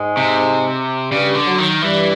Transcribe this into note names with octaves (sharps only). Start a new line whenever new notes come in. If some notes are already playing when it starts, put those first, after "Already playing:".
Already playing: G#2 G#3
C3
G2 C#3 G3
D3
F#3
D#3
G2 E3 G3